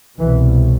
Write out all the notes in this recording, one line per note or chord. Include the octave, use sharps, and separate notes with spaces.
C2 B2 E3